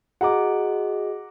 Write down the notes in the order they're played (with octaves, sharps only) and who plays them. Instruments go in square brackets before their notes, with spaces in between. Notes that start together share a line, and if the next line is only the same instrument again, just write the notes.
[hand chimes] F#4 G#4 D#5 [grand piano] F#5 A#5 D6